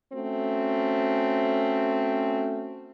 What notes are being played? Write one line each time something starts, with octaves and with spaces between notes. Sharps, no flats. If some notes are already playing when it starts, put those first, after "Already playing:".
A3 C4 C#4 F#4